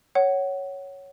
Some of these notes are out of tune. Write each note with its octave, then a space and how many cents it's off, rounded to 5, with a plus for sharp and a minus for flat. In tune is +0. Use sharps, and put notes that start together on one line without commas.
C#5 +0 F#5 +20